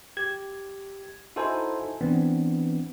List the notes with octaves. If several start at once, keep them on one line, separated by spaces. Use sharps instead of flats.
G4 G#6
D#4 E4 F#4 A4 C5 G#5
E3 B3 C4 D4